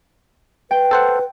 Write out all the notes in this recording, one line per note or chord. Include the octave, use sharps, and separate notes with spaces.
B4 G5
A4 C5 F#5